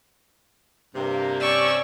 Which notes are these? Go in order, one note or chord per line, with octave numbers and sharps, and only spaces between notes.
G2 C3 A#3
C#4 D5 C#6 E6